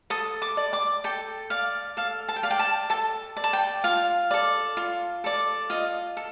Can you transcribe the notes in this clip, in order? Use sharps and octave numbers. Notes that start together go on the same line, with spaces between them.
A4 D#6
D6
D5
D6
A4 G5
D5 F5
A4 F5
A5
G5
D5 F5
G5
A5
A4 A5
D5
A5
G5
F4 F5
A4 D5
F4
A4 D5
F4 D#5
A4